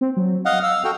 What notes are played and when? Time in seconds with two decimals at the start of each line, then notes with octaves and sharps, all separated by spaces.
0.01 C4
0.17 F#3
0.45 D#5 F5 F#5 F6
0.63 F5 E6
0.84 F#4 A4 G5